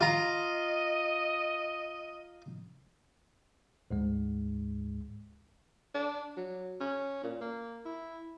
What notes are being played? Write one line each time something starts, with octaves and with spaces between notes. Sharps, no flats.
F4 D#5 A#5
D2 G#2 G#3
D4
F#3
C#4
A#2
A#3
E4